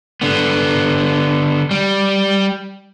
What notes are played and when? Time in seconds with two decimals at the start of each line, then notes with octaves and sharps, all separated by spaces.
0.22 D3 B3
1.71 G3